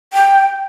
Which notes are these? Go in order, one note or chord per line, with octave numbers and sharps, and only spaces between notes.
G5